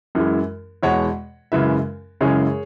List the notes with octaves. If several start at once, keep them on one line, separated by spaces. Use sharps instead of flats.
F#2 E3 G#3
E2 B2 G#3 C#5 F#5
F#2 C#3 E3 G#3 B4 E5
F#2 C#3 E3 G#3 G#4 C#5